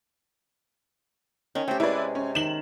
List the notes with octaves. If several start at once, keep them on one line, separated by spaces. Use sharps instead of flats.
D#3 C#4
A3 C4 G4
C3 G#3 E4 B4 D5
C#4
D#3 E7 F#7